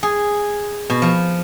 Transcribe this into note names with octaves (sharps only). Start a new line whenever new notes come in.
G#4
B2
F3